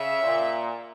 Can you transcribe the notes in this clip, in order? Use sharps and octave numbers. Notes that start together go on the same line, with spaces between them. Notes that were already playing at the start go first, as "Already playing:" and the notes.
Already playing: C#3 E5
A#2